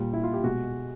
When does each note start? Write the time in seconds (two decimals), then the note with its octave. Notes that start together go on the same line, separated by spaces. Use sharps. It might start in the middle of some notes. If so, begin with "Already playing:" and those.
Already playing: A#2 G3
0.13 E4
0.24 F4
0.33 G4
0.44 B2 G#3 F#4